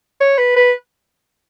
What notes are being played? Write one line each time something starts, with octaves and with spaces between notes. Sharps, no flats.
C#5
B4
B4